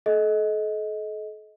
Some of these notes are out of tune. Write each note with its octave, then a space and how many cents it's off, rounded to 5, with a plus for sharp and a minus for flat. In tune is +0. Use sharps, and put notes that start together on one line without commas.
A4 -40 D#5 +20